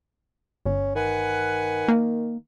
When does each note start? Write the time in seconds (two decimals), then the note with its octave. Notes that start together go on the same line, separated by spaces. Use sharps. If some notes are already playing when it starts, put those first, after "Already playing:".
0.66 G1 C#4
0.96 D#3 B4 F#5 G#5
1.88 A#3